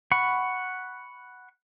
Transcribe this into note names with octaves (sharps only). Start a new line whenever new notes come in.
F#5 B5 C#6